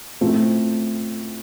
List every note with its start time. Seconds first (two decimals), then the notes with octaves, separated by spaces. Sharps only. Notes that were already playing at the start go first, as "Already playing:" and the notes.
0.21 A2 A3 C4 F4